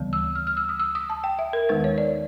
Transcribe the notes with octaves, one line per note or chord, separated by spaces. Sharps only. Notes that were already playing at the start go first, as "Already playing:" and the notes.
Already playing: D2 C#3 E3 G3 B3
E6
F6
F6
E6
D#6
E6
D#6
A5
G5
E5
A#4
D#2 D#3 G#3 B3 D#4 B4
C#5
D5